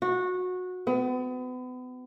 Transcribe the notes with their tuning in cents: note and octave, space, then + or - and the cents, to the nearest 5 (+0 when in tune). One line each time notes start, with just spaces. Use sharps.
F#4 -20
B3 +35